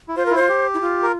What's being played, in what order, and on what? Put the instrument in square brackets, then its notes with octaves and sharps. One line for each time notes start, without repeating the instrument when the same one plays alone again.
[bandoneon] E4
[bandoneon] F4 [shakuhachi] C5
[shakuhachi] A#4
[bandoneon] E4
[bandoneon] F4 [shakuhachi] C5
[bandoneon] G4
[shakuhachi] E4
F4
[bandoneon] A#4